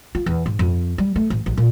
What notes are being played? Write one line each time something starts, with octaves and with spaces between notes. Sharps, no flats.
F4
E2
G#2
F2
G3
A3
A1
A1
A#2